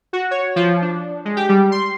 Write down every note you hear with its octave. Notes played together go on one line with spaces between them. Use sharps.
F#4
C#5
F3
D4
G#3
G4
G3
C6